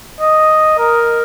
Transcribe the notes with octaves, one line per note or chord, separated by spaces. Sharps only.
D#5
A#4